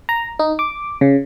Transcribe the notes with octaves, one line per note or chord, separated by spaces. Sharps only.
A#5
D#4
D6
C#3